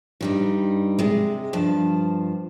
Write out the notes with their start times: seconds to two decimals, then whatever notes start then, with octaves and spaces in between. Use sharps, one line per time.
0.21 G2 G3 D#4
0.99 C3 G#3
1.53 G2 F3 A5